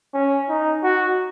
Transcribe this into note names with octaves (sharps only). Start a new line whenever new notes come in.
C#4
D#4
F#4